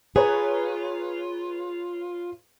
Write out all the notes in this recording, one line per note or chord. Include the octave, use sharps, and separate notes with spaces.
F4 G#4 B4 C#5 A#5